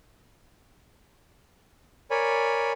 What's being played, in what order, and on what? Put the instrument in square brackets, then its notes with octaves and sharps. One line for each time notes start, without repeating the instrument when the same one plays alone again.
[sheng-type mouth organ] A#4 C#5 D5 G#5 B5